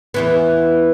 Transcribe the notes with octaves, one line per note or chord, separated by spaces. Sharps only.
E2 E3 B3